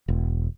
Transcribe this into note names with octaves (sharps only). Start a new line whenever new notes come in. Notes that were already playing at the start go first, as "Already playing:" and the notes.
E1